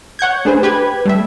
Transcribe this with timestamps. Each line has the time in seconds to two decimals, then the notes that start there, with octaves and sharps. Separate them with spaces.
0.19 C#5 F#5 G6 G#6
0.45 A3 D4 G#4 B4 C5
0.63 G4 B4 G#6
1.06 G3 A3 E5